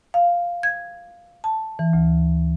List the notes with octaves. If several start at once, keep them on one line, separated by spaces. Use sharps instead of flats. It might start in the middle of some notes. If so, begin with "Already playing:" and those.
F5
G#6
A5
E3
D2